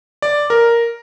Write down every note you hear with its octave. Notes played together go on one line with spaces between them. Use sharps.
D5
A#4